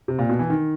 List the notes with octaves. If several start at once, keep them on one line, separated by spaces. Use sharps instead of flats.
C3
A#2
B2
E3
D#3